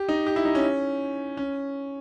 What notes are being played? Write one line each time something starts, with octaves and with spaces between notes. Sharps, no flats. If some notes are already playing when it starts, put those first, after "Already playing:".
Already playing: G4
D#4
G4
E4
D#4
C#4
C#4